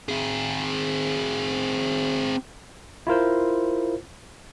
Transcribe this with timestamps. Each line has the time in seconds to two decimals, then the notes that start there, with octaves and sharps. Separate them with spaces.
0.09 C4 G#4
3.07 E4 F4 A#4 C5